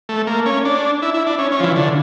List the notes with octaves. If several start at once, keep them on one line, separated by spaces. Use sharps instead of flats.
A3
A#3
C#4
D4
E4
E4
D4
C#4
C#4
F3
E3
D3